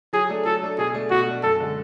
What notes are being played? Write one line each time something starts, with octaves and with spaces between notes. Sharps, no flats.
F#3 G#4
A3 D4 A4
F#3 A4
A3 D4 A4
B2 G#4
A3 D4
B2 F#4
A3 D4
F#2 A4
D3 G#3